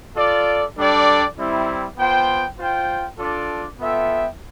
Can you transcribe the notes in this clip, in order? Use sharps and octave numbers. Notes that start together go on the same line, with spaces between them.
F4 A4 D5
G3 D4 A4 D5 G5
G3 C4 E4
B3 F4 C5 G5
F4 C5 G5
D4 F4 A4 D5
B3 F4 A4 E5 G5